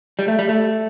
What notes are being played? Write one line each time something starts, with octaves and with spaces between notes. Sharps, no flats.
G3
A3
G3
A3